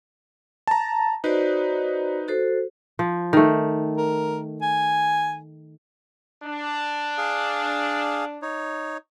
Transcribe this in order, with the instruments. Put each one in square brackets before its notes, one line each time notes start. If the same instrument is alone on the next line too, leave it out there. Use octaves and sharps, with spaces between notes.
[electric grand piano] A5 A#5
[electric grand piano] D#4 B4 [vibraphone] F#4 C5 D5
[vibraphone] F#4 A4 C5
[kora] F3
D#3 A3
[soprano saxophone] A#4
G#5
[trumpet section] D4
[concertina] G#4 F5
D#4 C#5